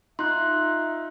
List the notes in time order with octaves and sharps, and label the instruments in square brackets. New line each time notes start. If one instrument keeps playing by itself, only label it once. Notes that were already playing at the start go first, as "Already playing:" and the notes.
[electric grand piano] D#4 F4 [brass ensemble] E5 [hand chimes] C6 F#6